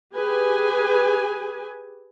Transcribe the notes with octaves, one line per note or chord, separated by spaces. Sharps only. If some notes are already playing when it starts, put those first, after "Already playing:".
G4 G#4 B4 G#5